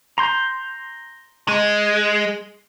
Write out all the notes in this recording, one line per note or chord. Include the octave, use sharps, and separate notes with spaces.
A#5 C6 G6
G#3